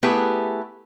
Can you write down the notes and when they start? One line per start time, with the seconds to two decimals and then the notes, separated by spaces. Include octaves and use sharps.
0.03 A3 B3 E4 G4 G#4 B4